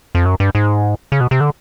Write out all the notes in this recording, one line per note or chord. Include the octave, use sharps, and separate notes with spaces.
F2
F#2
G2
G#2
C#3
B2
C3
D3